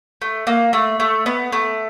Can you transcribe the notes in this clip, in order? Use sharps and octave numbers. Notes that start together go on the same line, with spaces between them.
A3
A#3
A3
A3
B3
A3